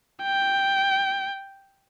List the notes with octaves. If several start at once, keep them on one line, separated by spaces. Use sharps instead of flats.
G5